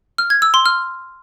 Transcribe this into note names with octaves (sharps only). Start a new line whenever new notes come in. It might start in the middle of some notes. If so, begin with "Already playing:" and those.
F6
G#6
E6
C6
F6